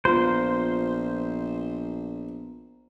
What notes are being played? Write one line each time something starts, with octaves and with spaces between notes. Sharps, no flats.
A#1 B3 F4 C5 A#5